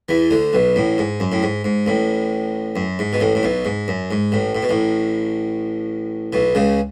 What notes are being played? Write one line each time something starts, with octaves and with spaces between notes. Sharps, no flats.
E2 E3
D2 D3
B1 B2
A1 A2
G#2
F#2
A2
G#2
G#2
A1 A2
F#2
G#2
B2
A1 A2
A2
B1 B2
G#2
F#2
G#2
A1 A2
A2
B2
A1 A2
B1 B2
C#2 C#3